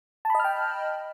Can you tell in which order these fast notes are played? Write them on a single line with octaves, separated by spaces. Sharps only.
A5 B5 D#5 F6 G5